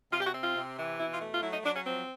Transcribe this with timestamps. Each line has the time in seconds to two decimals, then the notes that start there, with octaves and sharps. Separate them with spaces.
0.12 C3 F4
0.20 G4
0.27 F#4
0.34 C4
0.42 F4
0.56 C3
0.78 E3
1.00 B2 E4
1.13 F4
1.21 A3
1.32 F4
1.43 F#3 E4
1.53 D#4
1.64 F#3 D4
1.75 C#4
1.86 F3 C4